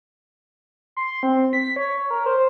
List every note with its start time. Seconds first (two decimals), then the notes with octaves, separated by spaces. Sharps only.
0.97 C6
1.23 C4
1.53 B6
1.76 C#5
2.10 A#4
2.26 C5